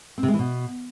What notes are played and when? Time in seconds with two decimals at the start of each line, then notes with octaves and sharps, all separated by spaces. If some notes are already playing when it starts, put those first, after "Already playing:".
0.18 C4
0.23 C3
0.28 G#3
0.34 E3
0.39 B2